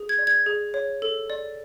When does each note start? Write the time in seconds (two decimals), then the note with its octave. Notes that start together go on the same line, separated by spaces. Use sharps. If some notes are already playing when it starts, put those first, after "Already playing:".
Already playing: G#4
0.09 G#6
0.18 D5
0.27 G#6
0.46 G#4
0.74 C#5
1.02 A4
1.30 D5